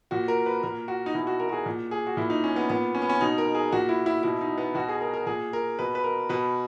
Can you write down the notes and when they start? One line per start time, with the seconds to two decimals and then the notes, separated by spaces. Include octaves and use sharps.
0.11 A#2 F#4
0.28 A#4
0.46 B4
0.63 A#2 A#4
0.88 F#4
1.06 D#4
1.14 B2 E4
1.27 F#4
1.40 A#4
1.49 F#4
1.52 G#4
1.66 A#2
1.91 G#4
2.07 F#4
2.17 A#2 E4
2.30 D#4
2.44 C#4
2.56 B3
2.70 A#2 B3
2.95 C#4
3.02 B3
3.10 C#4
3.21 B2 D#4
3.38 A#4
3.55 G#4
3.72 A#2 F#4
3.89 E4
4.06 E4
4.23 B2 E4
4.41 D#4
4.58 B3
4.75 B2 F#4
4.89 G#4
5.01 A#4
5.13 A#4
5.26 A#2 G#4
5.53 A#4
5.79 B2 B4
5.95 B4
6.04 A#4
6.29 B2 B4